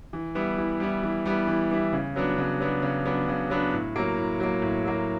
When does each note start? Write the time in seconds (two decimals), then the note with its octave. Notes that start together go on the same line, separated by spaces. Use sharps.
0.13 E3
0.35 G3 B3 E4
0.58 E3
0.80 G3 B3 E4
1.03 E3
1.26 G3 B3 E4
1.47 E3
1.71 G3 B3 E4
1.93 C#3
2.16 F#3 B3 D4
2.38 C#3
2.60 F#3 B3 D4
2.82 C#3
3.05 F#3 B3 D4
3.28 C#3
3.50 F#3 B3 D4
3.73 A2
3.96 F#3 A#3
4.18 A2
4.40 F#3 A#3
4.62 A2
4.85 F#3 A#3